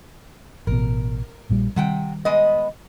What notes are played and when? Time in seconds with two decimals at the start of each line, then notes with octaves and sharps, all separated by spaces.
0.67 A1 B2 A#4
1.49 A#1 A#2 G3
1.76 C3 D#3 G3 F#5 G5
2.25 G#3 B3 D#5